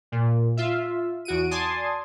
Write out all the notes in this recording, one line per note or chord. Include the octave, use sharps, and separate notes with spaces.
A#2
F4 E5
E2 F#4 D7 D#7
D5 G#5 A5 C6 D#6